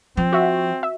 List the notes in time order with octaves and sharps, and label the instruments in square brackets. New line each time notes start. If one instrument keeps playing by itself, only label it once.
[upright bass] F3 [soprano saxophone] C4
[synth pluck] F#4 E5
E5